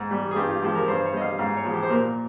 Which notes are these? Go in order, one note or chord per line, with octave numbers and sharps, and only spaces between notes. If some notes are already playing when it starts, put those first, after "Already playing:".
Already playing: G#2
G3
G#4
G2 G4
F4
F3 G#3 G4
A#4
G2 C5
C#5
G3 D#5
F5
G#2 F5
C#5
F3 G#3
G4
C5
A#2 A#4